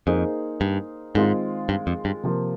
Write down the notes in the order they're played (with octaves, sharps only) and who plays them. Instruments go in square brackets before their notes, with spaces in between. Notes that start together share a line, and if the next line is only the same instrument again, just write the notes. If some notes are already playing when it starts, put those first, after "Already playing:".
[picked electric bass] F2 [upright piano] A#3 D#4 G#4 C5
[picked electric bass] G2
[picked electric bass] G#2 [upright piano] D#3 G#3 C4 F4
[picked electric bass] G2
F2
G2
[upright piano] C3 F3 A#3